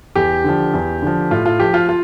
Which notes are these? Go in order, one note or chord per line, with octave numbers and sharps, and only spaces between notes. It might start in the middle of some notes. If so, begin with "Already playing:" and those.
E2 G4
D3 F3
E2
D3 F3
A2 F4
F4
F3 G4
F4
F4